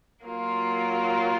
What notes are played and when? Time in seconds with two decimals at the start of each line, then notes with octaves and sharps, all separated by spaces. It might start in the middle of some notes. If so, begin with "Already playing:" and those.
0.25 F#3 A#3 F4